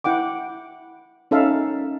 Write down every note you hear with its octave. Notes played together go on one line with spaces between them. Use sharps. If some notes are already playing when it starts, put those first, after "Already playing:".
E4 F#5 G5 D6
C#4 D#4 A4 E5 F5